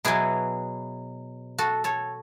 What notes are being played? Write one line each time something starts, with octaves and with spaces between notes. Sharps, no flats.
B2 F#3 E4 G#4
F#4 A4
A4 C#5